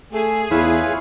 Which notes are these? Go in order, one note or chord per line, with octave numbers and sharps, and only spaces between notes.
A3 G#4
E2 E4 F4 B4 C#5